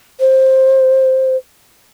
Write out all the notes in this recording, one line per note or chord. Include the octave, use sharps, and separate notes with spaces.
C5